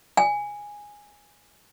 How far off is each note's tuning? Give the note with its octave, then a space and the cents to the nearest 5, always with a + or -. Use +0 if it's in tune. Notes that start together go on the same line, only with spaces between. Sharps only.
G#5 -10